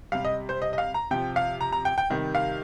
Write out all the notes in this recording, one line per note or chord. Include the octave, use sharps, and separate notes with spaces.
C3 G3 F5
D#5
C5
D#5
D#5
F5
A#5
C3 F3 G5
F5
A#5
A#5
G5
G5
C3 D#3 G3
F5